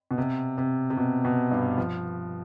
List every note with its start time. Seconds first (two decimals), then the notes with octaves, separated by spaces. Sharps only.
0.11 B2
0.18 C3
0.58 C3
0.90 C3
0.97 B2
1.25 B2
1.51 G2
1.78 F3